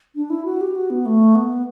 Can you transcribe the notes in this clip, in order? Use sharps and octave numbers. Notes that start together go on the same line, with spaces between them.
D4
E4
F#4
G4
F#4
B3
A3
B3